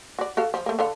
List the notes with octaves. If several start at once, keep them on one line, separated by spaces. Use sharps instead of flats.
F#4 D5
F#4 A4 F5
F3
A3 A#3
D3 A4 F5